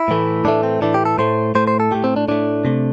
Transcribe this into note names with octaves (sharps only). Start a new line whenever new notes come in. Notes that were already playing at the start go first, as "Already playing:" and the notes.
Already playing: E4
A2 E3 A3
A2 E3 A3 D4
C4
A2 E3 A3 D4
G4
A4
A2 A3 C5
A2 A3 C5
C5
A4
A2 A3 G4
C4
D4
A2 A3 D4
C3 A3